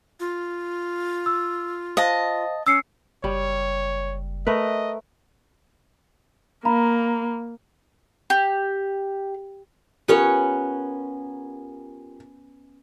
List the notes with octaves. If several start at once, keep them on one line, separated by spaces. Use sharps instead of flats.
F4
E6
C5 D#5 F5 A5
C#4 E6 C7 C#7
F#1 G3 C#5
A3 A#4 B4 D#5
A#3 F5 A#5 B5
G4
B3 C#4 F4 G4 A#4 C#5